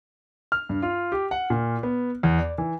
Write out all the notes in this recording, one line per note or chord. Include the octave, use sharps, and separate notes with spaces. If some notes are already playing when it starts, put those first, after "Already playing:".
F6
G2
F4
G4
F#5
A#2
B3
E2
D5
E3